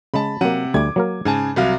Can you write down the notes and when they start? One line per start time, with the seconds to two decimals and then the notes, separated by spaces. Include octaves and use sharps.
0.14 C#3 G#3 A5 B5
0.41 C3 F#3 A#3 F#5 D#7
0.74 D2 G3 A3 D6 G#6
0.96 F#3 A#3 A#4
1.25 G#2 C#3 G#5 A5
1.56 C2 F#3 F5